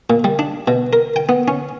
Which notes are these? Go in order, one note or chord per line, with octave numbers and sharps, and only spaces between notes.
A#2
G3
D4
B2
A#4
G5
B3
C#4